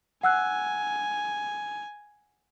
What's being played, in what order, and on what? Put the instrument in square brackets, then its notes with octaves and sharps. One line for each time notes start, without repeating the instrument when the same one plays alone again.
[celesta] F#5 E6 F#6 [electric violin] G#5